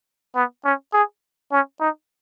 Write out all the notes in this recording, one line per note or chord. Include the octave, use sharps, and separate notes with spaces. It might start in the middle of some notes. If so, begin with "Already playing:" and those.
B3
C#4
G#4
C#4
D#4